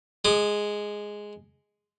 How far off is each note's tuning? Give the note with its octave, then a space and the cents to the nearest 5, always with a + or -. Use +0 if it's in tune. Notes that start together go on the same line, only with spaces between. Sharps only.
G#3 +0 D#6 -45